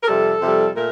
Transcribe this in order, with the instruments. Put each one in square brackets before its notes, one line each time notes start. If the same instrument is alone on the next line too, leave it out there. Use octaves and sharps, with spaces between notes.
[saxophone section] A#4
F2 C3 G3 A4
F2 C3 G3
A#2 A3 A#4